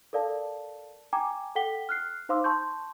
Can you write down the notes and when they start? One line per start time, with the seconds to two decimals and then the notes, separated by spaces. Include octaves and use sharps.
0.13 A4 A#4 D5 F5 A5
1.13 G5 G#5 A#5 D6 G#6
1.55 A4 F#5 G5 B6 G7
1.89 F6 F#6 C7
2.29 D#4 C5 F5 C6 D6 E6
2.44 A5 C6 C#6 G6